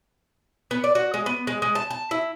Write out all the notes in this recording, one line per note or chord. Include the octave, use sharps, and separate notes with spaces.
B3
D5
F#4
G#3
B3
G#3
G#3
A5
A5
E4